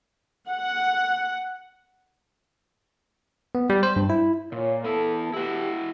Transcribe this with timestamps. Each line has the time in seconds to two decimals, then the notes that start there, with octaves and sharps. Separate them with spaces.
0.50 F#5
3.55 B3
3.70 G3
3.83 C5
3.96 G2
4.10 E4
4.52 A#2 F4 C#5
4.84 B3 E4 A4
5.34 A3 B3 E4 F#4 G4